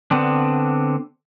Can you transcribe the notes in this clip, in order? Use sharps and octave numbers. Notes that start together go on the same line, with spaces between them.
D3 B3 C4 D4